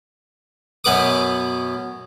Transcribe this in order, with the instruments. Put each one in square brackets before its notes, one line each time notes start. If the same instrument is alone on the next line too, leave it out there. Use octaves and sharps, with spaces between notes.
[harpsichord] F#2 B2 B3 B4 D6 D#6